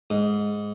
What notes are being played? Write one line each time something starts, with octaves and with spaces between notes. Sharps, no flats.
G#2